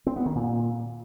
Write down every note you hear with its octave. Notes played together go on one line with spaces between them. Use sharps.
C4
B3
D#3
A#2